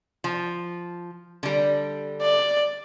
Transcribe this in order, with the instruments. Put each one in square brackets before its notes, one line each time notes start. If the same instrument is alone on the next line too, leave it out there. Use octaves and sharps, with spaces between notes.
[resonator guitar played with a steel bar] F3
D3 G3
[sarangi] D5